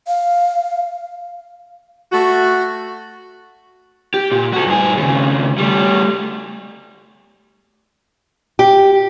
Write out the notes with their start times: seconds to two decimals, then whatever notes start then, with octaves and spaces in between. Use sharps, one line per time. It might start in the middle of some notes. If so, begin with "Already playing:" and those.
0.07 F5
2.12 A3 F#4
4.14 G4
4.31 A#2
4.53 F#4 A4
4.66 G2 G#4
4.97 D#2 C#3
5.58 G3 A3
8.59 G4